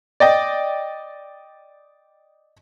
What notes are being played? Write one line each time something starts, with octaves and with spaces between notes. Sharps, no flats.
D5 D#5 G5